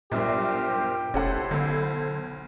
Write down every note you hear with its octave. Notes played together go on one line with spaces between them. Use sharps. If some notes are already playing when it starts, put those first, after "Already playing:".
B1 G2 A#2 G4 A#4 C5 E5 F6
F1 C#4 E4 A4 C5 F#5 G#6
B1 D3 A4